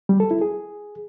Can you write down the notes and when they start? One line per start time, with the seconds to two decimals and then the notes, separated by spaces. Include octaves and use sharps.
0.09 G3
0.20 A4
0.31 E4
0.41 G#4